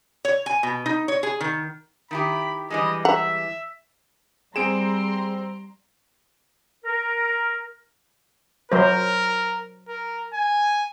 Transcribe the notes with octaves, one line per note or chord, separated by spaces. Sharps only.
C#5
G#5
B2
D#4
C#5
G#4
D#3
D#3 E4 G4 B5
E3 G3 G#3 D#5
E5 F#5 A#5
G3 C4 G#4 A#5 C6 D7 E7
A#4
F#3 A#4 C5
A#4
G#5